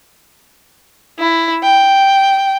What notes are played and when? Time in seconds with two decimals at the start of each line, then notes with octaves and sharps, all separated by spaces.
1.19 E4
1.63 G5